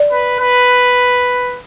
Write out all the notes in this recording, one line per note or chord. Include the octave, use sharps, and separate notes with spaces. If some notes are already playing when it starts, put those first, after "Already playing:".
Already playing: D5
B4
B4